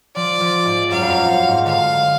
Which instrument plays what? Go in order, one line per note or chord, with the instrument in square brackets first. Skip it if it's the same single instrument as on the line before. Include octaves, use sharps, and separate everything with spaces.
[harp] F3 [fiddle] D5
[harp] F3
G#2
[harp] F#2 [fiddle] F5
[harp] F2
F#2
F#2
G#2
[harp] D3 [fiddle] F5